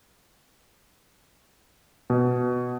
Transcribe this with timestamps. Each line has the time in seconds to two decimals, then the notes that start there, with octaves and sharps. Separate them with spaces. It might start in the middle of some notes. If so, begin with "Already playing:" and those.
2.10 B2